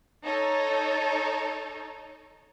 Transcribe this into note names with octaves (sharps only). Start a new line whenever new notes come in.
D#4 A4 C#5